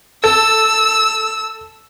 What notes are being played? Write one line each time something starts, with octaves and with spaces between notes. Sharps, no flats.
A4 E6